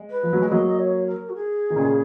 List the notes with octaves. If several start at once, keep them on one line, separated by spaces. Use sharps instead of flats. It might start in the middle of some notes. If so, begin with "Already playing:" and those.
Already playing: G#3
B4
F3
F#3
G#3
F#3 A#3 D#5
C#5
A#4
F#4
G#4
D#3
A#2 C#3